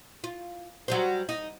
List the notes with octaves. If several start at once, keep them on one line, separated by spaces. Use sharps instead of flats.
F4
F#3 G3 C5
D#4